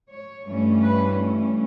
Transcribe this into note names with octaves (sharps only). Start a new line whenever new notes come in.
C#5
G2 E3 A3 C#4
B4